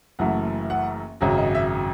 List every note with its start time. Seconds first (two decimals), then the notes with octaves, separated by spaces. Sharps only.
0.19 F#1 F#2 E3 A3 F#5
0.70 F#5
1.21 G#1 F#2 C#3 F#3
1.38 D#5
1.55 E5